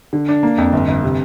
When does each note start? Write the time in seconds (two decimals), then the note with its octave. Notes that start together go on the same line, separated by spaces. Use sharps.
0.13 D3
0.29 D4
0.43 A#3
0.58 F2
0.73 G1
0.88 G1
1.03 C3